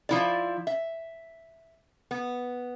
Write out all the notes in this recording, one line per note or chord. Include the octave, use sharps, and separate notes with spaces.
F3 E4 D5
E5
B3